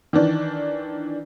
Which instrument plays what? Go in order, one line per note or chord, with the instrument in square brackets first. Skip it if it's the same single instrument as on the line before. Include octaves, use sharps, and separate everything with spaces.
[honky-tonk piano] D#3 E3 D4